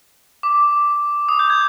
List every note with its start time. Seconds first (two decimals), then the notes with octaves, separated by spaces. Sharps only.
0.43 D6
1.29 D#6
1.39 G6
1.50 G#6